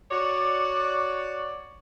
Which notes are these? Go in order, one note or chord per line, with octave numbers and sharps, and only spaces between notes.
F#4 C#5 D5